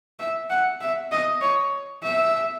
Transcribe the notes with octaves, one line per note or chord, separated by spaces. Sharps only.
E5
F#5
E5
D#5
C#5
E5